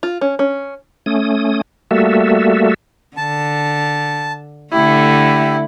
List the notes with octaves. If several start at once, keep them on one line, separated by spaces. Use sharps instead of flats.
F4
C#4
C#4
A3 C#4 D#6
G3 A3 A#3 F#4 A4 E5
D3 A5
D3 A3 E4 G4